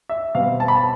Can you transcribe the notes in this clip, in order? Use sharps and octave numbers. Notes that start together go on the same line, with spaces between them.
E5
B2 G3 C4 F5
A5
B5
A5